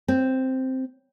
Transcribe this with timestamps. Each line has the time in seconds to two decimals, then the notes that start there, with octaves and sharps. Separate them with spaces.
0.08 C4